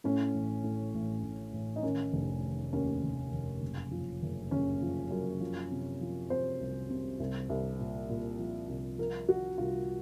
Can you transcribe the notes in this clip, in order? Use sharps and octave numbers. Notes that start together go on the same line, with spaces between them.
A2 C#4
A1
A2
A1
A1
A1
D#4
D#3 C#4
F1
D#3
D#2 C#4
F1
F1
F#1
F3
F#1
F#1 C#4
F3
F#2
F3
C3
F3
C3 C5
C2
C3
C2
C2
A#2
A#2
F3
C2
F3 A#4
F3 F#4
C2 F4